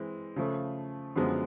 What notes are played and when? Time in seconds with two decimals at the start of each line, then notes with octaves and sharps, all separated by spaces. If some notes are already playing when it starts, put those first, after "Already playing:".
Already playing: E3 G#3 C4
0.36 C#3 F3 A3
1.16 F#2 D3 F3 G#3 B3